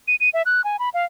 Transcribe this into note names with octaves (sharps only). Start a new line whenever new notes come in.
D#7
D#7
E5
F#6
G#5
B5
F5